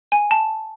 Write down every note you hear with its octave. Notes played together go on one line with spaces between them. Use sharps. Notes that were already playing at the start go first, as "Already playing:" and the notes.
G#5
A5